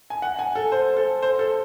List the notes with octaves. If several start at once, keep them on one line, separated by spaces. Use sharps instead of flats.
G#5
F#5
G#5
A4
C5
A4
C5
A4